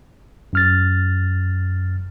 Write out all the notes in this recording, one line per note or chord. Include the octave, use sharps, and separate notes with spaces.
F#2 F6 A6